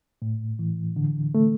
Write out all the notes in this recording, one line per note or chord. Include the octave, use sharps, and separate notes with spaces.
A2
E3
D3
A3